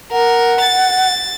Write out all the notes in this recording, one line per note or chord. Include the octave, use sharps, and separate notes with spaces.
A#4 F#5
A6